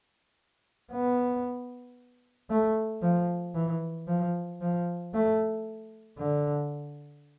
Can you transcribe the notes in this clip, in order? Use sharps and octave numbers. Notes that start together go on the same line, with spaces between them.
B3
A3
F3
E3
F3
F3
A3
D3